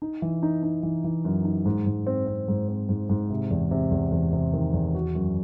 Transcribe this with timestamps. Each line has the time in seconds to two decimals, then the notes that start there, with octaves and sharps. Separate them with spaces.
0.02 D#4
0.22 E3
0.43 D#4
0.63 D#4
0.83 E3
1.04 E3
1.25 F#2
1.45 D#4
1.66 G#2
1.86 G#2
2.07 C4
2.27 C4
2.48 G#2
2.69 C4
2.89 G#2
3.09 G#2
3.30 C3
3.50 E2
3.71 C3
3.91 E2
4.12 E2
4.33 C3
4.53 D#3
4.74 E2
4.94 F#4
5.15 F#2